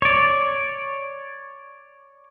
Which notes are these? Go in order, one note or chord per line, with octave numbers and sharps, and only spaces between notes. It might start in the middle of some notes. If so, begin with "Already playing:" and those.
C#5 D5